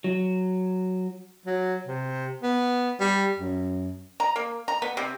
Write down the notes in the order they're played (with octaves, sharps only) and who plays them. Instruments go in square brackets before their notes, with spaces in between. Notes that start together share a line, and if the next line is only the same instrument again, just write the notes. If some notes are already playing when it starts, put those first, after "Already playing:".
[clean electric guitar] F#3
[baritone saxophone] F#3
C3
B3
G3
F#2
[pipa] A#5
A#3
A#5
B3
C3